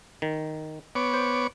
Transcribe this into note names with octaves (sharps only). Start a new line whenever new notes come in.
D#3
B3 C#5 D6
C5